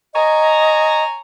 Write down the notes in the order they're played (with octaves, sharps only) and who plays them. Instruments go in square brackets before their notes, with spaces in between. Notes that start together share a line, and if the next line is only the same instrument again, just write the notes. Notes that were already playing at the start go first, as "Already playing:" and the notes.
[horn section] C#5 G#5 A#5 [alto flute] D#5